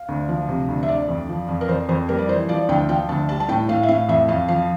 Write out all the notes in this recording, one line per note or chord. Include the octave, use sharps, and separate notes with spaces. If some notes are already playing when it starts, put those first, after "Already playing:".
Already playing: F5
D2
F3
C3
D2
E5
D3 D5
F2
F3
F2
A#4
F2 C5
F2 C5
G3 A#4
D5
E3 C5
F3 D5
D2 G5
F3 G5
D2 A5
G3 A5
A5
A2 G5
A2 F5
E5
A2 F5
F2 E5
F2 F5
F3 F5